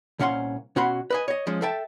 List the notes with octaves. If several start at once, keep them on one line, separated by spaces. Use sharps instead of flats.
C2 A#2 C#4 F5 F#5 C6
B2 C#4 F#4 F#5 B5 C6
B4 D#5 G#5
C#5 D#5
F3 G#3 C#4
A4 E5 G5 A5